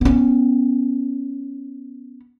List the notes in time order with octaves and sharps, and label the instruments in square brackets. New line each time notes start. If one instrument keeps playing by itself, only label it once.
[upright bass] B3 C#4